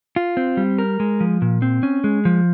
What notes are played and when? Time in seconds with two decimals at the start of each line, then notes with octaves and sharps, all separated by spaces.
0.16 F4
0.37 C4
0.57 G3
0.78 A#4
1.00 G#3
1.20 F3
1.42 A#2
1.62 C4
1.83 C#4
2.04 G#3
2.25 F3